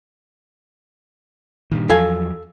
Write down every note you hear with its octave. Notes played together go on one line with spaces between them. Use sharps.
G2 A#2 D#3
E2 F3 F#3 A4 F5 G#5